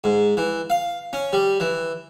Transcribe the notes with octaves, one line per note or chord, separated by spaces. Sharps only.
G#2
E3
F5
C#4
G3
E3